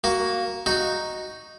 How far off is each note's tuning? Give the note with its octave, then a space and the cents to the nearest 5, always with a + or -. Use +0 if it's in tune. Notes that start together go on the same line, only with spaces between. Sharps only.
A#3 +0 F#4 +15
D#4 +0 F#4 +0